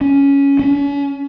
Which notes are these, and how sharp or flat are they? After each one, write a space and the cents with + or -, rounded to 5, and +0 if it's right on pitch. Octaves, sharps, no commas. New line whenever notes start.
C#4 +10
C#4 +40